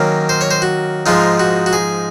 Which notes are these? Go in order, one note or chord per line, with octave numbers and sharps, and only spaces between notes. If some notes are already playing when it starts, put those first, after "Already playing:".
Already playing: D#3 F#3 A#3 C#4
C5
C#5
C5
F#4
G#2 F3 G#3 D#4 F4
F#4
F#4
G#4